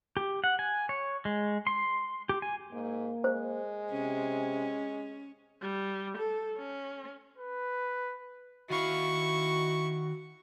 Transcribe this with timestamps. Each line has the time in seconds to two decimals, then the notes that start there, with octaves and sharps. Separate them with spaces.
0.17 G4
0.44 F#5
0.59 G#5
0.89 C#5
1.25 G#3
1.67 C6
2.29 G4
2.42 G#5
2.72 G#2 A#3
3.24 G#3 C5
3.91 C3 C#4
5.62 G3
6.18 A4
6.58 C#4
7.38 B4
8.70 D#3 E4 F#4 F5 C#6